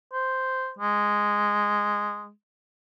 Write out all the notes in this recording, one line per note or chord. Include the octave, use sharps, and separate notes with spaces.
C5
G#3